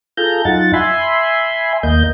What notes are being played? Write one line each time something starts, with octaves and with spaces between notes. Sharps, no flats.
F4 G#4 A4 A#5 G6
F#2 D#4 F4 F#5 A6
E5 G#5 B5 C6
D#2 A#3 D#5 G6